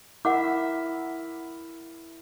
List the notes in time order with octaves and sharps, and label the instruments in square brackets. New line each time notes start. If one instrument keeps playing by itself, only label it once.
[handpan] E4 A#4 E5 [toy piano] F#5 D6